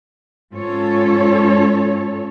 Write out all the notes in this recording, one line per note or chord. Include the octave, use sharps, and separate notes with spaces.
G#2 C#4 F4 A4 C#5